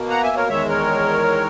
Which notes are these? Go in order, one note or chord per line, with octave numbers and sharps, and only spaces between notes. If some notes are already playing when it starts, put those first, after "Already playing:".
Already playing: B2 A#3
F#5 A#5
E5 G#5
A#4 C#5
E2 D#3 G#3 C#5 E5
A#4 C#5